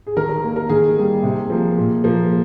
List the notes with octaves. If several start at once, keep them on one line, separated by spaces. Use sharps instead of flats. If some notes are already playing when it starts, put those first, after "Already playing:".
G#4
D#3 A#4
A#4
A#3
A#4
D#3 G#4
G3 A#3
C3
F3 A#3
A#2
F3 A#3